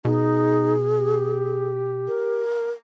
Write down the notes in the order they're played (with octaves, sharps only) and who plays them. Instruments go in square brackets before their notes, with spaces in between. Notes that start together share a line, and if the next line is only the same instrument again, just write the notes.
[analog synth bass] B2 [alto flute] D#4 [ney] G#4
[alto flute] G4
[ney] A#4